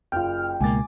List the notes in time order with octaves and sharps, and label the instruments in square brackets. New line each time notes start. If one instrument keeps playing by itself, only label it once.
[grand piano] F#1 [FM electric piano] F4 G5 [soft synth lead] F6
[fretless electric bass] C#2 B2 A#3 [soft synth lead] G#3 [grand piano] G#5 D6 A6